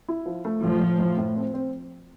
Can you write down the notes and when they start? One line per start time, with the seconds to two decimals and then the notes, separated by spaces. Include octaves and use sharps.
0.08 E4
0.26 F3
0.45 A3
0.63 A2 F3
0.80 A2
0.99 A2
1.18 A2
1.36 C4
1.54 C4